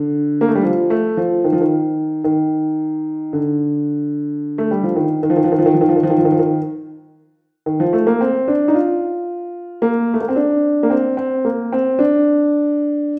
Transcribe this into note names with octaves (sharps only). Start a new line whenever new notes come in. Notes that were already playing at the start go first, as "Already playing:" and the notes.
Already playing: D3
A#3
A3
G3
F3
A3
F3
D#3
F3
D#3
D#3
D3
A3
G3
F3
D#3
D#3
F3
D#3
F3
D#3
F3
D#3
F3
D#3
F3
D#3
F3
D#3
F3
D#3
F3
D#3
D#3
F3
A3
A#3
C4
D4
D#4
F4
A#3
A3
A#3
C4
D4
A#3
C4
C4
A#3
C4
D4